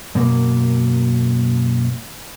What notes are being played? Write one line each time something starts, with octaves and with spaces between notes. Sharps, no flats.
F#2 B2 A#3